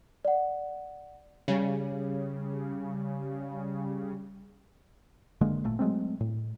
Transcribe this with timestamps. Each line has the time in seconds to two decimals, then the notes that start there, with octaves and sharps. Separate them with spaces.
0.25 D5 F#5
1.48 C#3 G3
5.41 F#1 D3 G#3 A#3
5.64 G#1 A#2 A3
5.79 F#3 G#3 A3 C4
6.21 A2